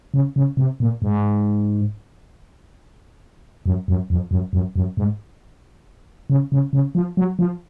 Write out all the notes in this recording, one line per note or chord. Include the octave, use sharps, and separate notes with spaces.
C#3
C#3
C3
A#2
G#2
F#2
F#2
F2
F#2
F#2
F#2
G#2
C#3
C#3
C#3
F3
F#3
F3